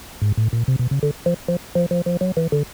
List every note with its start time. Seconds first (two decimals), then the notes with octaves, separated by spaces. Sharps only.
0.22 G#2
0.37 A2
0.53 A#2
0.68 C3
0.79 B2
0.91 C#3
1.03 D3
1.26 F3
1.48 F3
1.75 F3
1.91 F3
2.06 F3
2.21 F#3
2.37 E3
2.52 D3